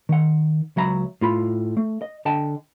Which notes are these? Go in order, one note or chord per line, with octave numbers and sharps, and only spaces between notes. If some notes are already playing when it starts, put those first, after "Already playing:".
D#3 F#5
C#2 F#3 E5 A#5 B5
A2 F4 B5
A3
D#5
D3 D#5 G5 A5